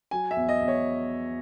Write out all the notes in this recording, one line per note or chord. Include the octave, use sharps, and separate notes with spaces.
F#3 G#5
E5
E2
D#5
E2
C#5